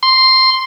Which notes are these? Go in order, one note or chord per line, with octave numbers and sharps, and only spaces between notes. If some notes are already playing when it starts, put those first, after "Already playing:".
C6